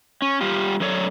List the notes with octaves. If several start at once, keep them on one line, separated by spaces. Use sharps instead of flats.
C#4
G3 F4 G4
F#2 F#3 A4 C#5 D5